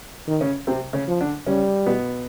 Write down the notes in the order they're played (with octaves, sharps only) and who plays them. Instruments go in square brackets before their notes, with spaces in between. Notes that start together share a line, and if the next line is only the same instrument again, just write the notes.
[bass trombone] D#3
[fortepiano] C#3 C#4
C3 C4
C#3 C#4
[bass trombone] F3
[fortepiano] D3 D4
[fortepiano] C#3 C#4 [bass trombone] G3
[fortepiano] B2 B3